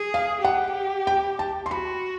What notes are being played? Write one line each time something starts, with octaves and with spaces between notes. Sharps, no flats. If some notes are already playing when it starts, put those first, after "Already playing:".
Already playing: G#4
F5
G4 F#5
G5
A5
C6
F#4 B5